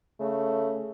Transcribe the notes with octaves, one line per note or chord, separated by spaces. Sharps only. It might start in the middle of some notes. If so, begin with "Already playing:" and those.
C#3 A3